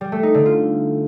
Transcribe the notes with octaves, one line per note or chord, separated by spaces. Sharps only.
G3
A3
D#4
D3
F4